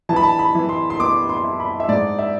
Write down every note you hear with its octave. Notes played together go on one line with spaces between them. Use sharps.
E3 A5
B5
A5
B5
E3
C6
C6
B3 D6
C6
E4
B5
E5
G#2 D5
E5